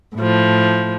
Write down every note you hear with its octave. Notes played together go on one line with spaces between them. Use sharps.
A2 F3